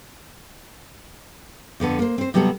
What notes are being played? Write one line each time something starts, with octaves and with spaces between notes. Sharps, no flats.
F2 D3 B3 A4
A#3 C5
C4 C5
C3 F#3 G3 B3 F#4 A4